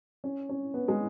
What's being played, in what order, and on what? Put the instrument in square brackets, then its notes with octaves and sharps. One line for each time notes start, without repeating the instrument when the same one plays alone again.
[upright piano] C#4
C#4
B3
G#3